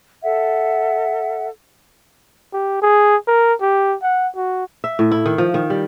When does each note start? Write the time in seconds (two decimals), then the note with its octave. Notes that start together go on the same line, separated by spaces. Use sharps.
0.23 A4 E5 F#5
2.53 G4
2.82 G#4
3.27 A#4
3.61 G4
4.03 F#5
4.36 F#4
4.84 E5
4.99 A2
5.11 E4
5.26 D#3
5.38 F3
5.54 D#3
5.70 G3